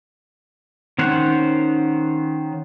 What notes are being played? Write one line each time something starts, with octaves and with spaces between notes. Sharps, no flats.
D#3 C#4 C5 F#5